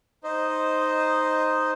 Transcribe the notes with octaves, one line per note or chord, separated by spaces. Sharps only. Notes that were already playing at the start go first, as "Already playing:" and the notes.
D#4 C5 D#5